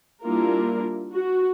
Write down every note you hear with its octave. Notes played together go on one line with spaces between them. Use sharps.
G3 A#3 D4 E4 F4 A#4
F#4